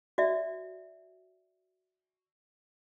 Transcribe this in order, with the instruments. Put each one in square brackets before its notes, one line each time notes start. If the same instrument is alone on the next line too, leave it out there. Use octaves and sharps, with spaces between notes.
[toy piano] F#4 D5 E5